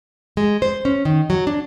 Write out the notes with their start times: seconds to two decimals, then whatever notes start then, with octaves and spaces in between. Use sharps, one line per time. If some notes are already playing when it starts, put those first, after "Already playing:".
0.37 G#3
0.62 C5
0.85 C#4
1.05 D#3
1.30 F#3
1.47 D4